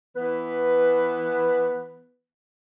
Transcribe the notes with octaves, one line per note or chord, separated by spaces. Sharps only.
E3 B3 B4